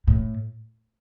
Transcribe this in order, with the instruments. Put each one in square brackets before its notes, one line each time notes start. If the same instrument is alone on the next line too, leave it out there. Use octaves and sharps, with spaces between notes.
[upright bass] A2